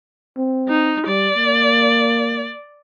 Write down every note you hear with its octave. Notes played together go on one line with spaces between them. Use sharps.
C4
D#4
G3 D5
A#3